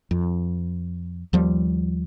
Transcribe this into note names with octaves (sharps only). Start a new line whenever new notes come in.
F2
D#2 F3 G3